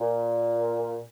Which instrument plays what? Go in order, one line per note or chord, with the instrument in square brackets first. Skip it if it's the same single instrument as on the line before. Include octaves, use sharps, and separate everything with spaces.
[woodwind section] A#2